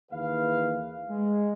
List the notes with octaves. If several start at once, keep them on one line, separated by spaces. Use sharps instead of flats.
D#2 E3 G#4 B4 F5
G#3